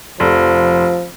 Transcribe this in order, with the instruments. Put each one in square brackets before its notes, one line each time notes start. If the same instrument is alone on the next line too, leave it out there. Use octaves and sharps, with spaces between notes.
[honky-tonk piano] F1 [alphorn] F3